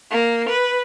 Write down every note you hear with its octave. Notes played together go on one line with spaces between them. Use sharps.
A#3
B4